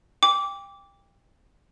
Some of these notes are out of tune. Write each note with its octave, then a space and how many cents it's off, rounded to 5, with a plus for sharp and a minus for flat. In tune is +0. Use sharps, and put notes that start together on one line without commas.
G5 +25 D6 -15